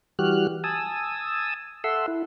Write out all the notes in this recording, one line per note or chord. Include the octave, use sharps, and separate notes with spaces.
E3 G3 F#4 G4 F6 F#6
G#5 A5 D#6 E6
A4 E5 F#5 C6 E6
E4